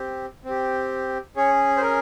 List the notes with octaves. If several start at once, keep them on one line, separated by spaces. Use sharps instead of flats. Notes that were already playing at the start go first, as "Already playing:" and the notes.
Already playing: C4 G4
C4 G4
C#4 G#4 C#5
C5
A#4